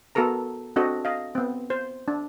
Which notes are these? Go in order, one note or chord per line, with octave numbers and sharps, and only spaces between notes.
B3 F#4 A4 A#4 A#5
C4 D4 F#4 A4 D#5
D#5 F5
B3 C4
C5
D4